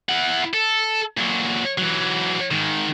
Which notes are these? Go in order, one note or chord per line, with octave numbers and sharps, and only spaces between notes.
E4 F#5
A4
A#2 F#3
E3 F#3
G#2 D#3